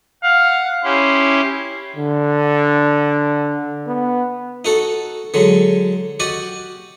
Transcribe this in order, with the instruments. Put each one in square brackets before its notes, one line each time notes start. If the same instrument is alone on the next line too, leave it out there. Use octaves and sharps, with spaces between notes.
[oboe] F5 [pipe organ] F#5
[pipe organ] C#4 E4 G4 [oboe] C6
[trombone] D3
B3
[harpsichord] D#4 F#4 A4
D3 F#3 G#3
F#4 G4 D5 D#5